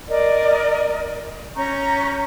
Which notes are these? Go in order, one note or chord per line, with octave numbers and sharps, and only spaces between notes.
A#4 D5 D#5
C#4 A#5 C#6 G6